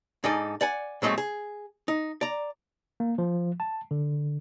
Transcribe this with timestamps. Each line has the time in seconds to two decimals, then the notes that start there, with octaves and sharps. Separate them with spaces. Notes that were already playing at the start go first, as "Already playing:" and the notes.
0.24 G#2 D4 D#4 A4 G#5
0.61 D5 F#5 G#5
1.02 A#2 F#3 G#3 A3 C4
1.18 G#4
1.88 D#4
2.21 D5 A#5
3.00 A#3
3.18 F3
3.60 A5
3.91 D3